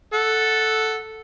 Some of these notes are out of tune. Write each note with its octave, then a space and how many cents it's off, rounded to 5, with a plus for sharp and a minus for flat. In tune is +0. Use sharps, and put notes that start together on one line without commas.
A4 +0 F#5 +0